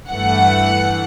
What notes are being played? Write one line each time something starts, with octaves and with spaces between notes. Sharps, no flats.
G2 E3 A3 F#5